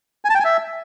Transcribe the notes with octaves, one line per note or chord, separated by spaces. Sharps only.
G#5
A5
G5
G#5
E5